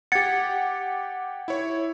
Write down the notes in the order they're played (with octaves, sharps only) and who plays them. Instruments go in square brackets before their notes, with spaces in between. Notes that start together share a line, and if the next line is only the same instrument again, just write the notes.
[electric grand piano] G4 F#5 [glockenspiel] G#6 A6 C#7
[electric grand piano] E4 C#5